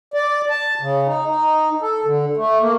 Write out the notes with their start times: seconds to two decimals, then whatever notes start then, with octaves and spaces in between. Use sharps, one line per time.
0.14 D5
0.50 A5
0.81 C#3
1.07 D#4
1.28 D#4
1.81 A4
2.05 D3
2.37 A3
2.60 A#3